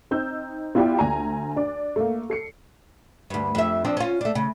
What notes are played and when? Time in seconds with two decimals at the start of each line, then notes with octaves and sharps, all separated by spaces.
0.11 C4 D#4 E6 G6
0.75 B3 E4 F4 G4 D5 G5
0.99 D2 G#5 A#5
1.56 D4 D5
1.96 A3 A#3
2.30 A4 C7 C#7
3.30 D2 G2
3.55 F2 E5
3.85 F3 C4 D4
3.97 C#4 F4
4.21 A3 D4
4.35 C#3